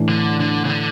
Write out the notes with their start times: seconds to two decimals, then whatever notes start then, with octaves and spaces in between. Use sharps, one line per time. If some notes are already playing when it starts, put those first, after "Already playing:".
Already playing: A2 E3 A3 D4
0.09 D3
0.40 D3
0.65 C#3
0.70 D3